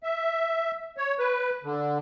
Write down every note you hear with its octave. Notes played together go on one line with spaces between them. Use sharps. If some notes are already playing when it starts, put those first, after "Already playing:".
E5
C#5
B4
D3